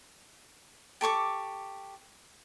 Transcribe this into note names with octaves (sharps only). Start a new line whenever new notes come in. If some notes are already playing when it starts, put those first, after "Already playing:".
G4 A4 C#6 D6